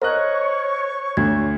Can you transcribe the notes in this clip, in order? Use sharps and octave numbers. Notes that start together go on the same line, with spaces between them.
A#4 C5 C#5 D#5 C#6 F#6
D2 G#6